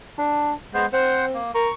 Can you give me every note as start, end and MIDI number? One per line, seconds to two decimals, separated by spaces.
0.19 0.52 62
0.74 0.86 56
0.74 0.86 59
0.74 0.86 72
0.93 1.39 60
0.93 1.25 72
0.93 1.25 78
1.34 1.51 58
1.55 1.70 70
1.55 1.74 85